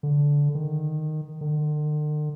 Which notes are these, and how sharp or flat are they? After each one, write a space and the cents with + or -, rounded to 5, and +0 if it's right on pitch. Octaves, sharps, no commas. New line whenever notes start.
D3 -15
D#3 -10
D3 +45